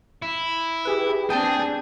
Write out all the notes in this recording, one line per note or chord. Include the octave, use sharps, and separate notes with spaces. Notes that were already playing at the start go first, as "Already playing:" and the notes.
E4
G4 G#4 B4
C4 D4 G#4 G5 A5 G6